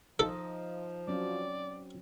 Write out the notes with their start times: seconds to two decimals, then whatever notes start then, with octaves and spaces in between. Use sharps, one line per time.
0.19 F3 D#4 A4 D#5
1.08 F#3 C4 C#4 D5